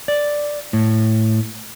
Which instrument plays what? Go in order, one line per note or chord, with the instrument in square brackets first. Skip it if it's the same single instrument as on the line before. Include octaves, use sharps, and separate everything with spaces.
[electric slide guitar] D5
A2